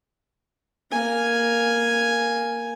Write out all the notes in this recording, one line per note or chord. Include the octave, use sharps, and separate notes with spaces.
A#3 G#5